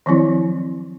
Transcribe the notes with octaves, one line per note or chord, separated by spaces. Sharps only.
D#3 F3 F#3 C4 E4